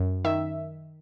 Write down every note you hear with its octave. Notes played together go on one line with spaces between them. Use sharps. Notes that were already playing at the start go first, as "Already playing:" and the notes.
Already playing: F#2
D#3 E5